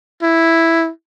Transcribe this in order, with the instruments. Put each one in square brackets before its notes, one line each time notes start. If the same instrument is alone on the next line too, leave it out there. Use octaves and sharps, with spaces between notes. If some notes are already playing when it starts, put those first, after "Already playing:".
[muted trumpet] E4